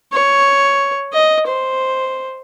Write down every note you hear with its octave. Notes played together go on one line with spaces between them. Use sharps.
C#5
D#5
C5